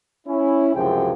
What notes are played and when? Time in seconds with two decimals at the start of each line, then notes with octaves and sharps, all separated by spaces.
0.27 C#4 E4
0.75 C#2 F#2 C3 F3 G#4 G5